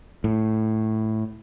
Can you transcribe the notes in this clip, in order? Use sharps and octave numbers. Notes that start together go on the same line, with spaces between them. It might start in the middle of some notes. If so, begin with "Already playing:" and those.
A2